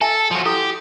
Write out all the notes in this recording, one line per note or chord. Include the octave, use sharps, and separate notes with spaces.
A4 E5 G#5 A5
F3 F#4
E4 G4 A4 D#6